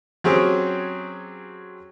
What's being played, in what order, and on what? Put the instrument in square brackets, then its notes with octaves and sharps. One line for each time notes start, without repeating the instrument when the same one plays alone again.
[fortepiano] F#3 C4 C#4 G4 G#4